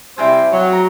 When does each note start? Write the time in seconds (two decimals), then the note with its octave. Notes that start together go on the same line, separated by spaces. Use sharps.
0.18 C3 G3 C4 E4 G5 G#5
0.52 F#3
0.72 A#5